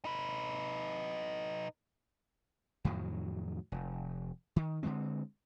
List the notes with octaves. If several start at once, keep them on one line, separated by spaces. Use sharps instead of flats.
D#4 B4
F2 A2 D#3 F#3
F1
D#3
D3 D#3 G#3 C4